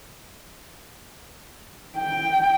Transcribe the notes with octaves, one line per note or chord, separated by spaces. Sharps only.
G5